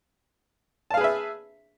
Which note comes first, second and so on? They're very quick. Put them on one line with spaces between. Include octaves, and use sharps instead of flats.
A5 F5 G#4 B4 E5